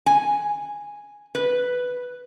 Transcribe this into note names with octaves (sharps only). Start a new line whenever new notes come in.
G#5
B4